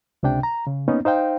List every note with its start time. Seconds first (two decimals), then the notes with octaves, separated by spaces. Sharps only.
0.23 C#2 C3 D4 G5
0.43 A#5
0.67 C#3
0.88 A#3 B3 C#4 D#4
1.05 D#4 C5 F5 G5